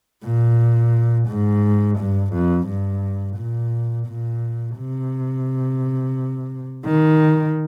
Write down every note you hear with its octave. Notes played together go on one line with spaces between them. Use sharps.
A#2
G#2
G2
F2
G2
A#2
A#2
C3
D#3